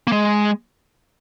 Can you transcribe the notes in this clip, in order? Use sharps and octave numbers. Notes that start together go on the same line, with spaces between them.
A#3
G#3